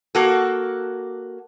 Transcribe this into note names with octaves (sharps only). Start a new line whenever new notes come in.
A#3 F#4 A4